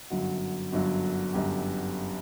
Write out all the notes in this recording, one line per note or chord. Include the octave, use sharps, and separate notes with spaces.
G1 F#2 D3 F#3 F#4
G1 F#2 D3 F#3
G1 F#2 D3 F#3 G4